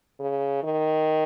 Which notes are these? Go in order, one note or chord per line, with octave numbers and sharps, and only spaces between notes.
C#3
D#3